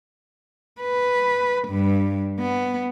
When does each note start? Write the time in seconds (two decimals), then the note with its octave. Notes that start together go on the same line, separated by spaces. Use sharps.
0.81 B4
1.68 G2
2.40 B3